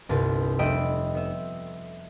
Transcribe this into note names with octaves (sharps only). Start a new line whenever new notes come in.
G1 C2 G3 B4
F1 D#5 E5 G5 B5 D7
B3 E5